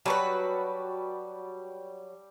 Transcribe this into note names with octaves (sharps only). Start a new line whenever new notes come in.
F#3 G3 F#4 B4 A5 C#6